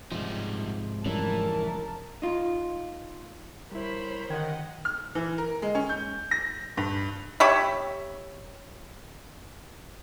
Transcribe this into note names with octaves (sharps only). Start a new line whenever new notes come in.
G#2 C3 F3 G3 D#4
F1 E3 G3 C#4 A#4 A5
D#4 F4
G3 E4 A#4 C5 C#5 B5
D3 D#3 G4 D#5 F#5 G5 G#6
F6
E3
A#4
G#3
C#4
G6
A#6
G2
G4 C#5 E5 B5